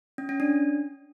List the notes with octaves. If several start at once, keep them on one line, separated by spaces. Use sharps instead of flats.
C#4
C#4
D4